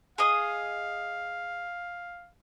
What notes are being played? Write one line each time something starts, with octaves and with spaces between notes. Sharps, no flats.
G#4 D#5 F5 D#6